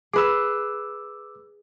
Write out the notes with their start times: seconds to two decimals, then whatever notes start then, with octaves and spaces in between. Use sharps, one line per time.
0.13 G#4 B4 D6 E6